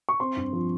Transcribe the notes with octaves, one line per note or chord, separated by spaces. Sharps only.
C#6
C4 C6
G2
F3